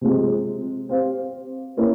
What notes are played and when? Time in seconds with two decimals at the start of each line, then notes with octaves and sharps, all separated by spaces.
0.01 C3 F3 G#3 C4
0.89 C4 G4 C5 F5
1.77 A#3 C#4 E4 A#4 C#5